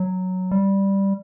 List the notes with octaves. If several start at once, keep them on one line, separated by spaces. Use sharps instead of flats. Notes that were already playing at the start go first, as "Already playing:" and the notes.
Already playing: F#3
G3